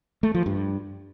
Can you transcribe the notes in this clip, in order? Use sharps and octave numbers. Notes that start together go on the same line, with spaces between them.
A3
F3
G2